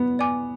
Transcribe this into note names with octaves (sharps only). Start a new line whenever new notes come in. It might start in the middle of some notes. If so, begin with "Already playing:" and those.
Already playing: B3
D5 G#5 D6